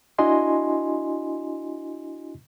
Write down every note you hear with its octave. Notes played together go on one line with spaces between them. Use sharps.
D4 E4 F#4 D#5 G#5 C6